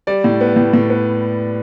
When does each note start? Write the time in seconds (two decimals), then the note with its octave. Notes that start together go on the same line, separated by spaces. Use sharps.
0.07 G3 D5
0.24 A2
0.41 B3
0.56 A2
0.74 A2
0.90 B3